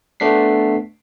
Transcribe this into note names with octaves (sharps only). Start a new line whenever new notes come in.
A3 B3 D4 B6 C7